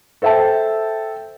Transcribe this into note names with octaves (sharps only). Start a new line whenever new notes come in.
A4 C5 E5 G5 A5